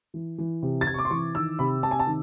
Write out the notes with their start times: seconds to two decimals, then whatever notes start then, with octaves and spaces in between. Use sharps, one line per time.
0.14 E3
0.38 E3
0.63 C3
0.81 A6
0.87 C3 G#6
0.94 C#6
0.98 D6
1.05 C6
1.10 E3 C#6
1.35 D#3 E6
1.59 C3 B5
1.83 C3 A5
1.91 G#5
1.99 A5
2.07 D#3